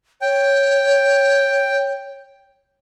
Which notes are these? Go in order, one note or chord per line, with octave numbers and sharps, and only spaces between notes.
C#5 G5